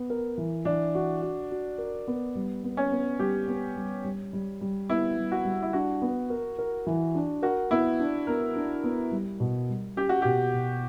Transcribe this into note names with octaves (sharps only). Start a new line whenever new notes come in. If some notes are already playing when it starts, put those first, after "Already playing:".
Already playing: B3
A#4
E3
E3 D4
F#4
F#4
F#4
A#4
B3
G3
B3
C#4
B3
G3 G4
B3
G3
G3
G3
G3
B3 E4
G3
F#4
G3
E4
D4 F#4
B3
A#4
A#4
E3
D4
F#4 A#4
B3 E4
D4
B3 A#4
D4
B3
G3
B2
G3
C#4 G4
F#4
B2 G4
B2